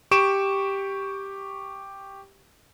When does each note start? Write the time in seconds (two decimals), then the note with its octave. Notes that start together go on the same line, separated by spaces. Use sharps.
0.11 G4 C#6 D7 E7